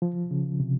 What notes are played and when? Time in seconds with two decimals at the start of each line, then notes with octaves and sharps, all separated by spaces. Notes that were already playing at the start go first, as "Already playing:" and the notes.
0.02 F3
0.31 C#3
0.60 C3